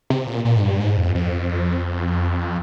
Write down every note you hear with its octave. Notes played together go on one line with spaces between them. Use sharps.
C3
A#2
A#2
G#2
G2
G#2
F2
F2